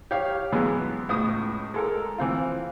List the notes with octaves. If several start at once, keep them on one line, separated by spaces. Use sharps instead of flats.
G4 C#5 F5
B2 E3 F#3 G#3 B3
C#2 A2 D#6
G#3 A4 A#4
E3 C4 F4